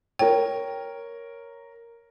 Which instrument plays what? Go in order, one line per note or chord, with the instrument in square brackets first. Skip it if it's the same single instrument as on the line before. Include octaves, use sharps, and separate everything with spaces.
[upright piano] A#4 C#5 [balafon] G5